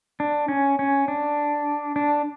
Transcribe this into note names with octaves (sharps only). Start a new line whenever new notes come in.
D4
C#4
C#4
D4
D4